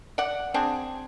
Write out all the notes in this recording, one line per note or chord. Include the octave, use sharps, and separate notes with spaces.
D5 F#5
C4 D4 G#4